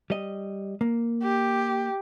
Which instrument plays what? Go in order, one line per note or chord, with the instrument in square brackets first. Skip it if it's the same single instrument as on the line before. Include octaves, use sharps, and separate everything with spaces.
[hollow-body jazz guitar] G3 D#5
A#3
[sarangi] G4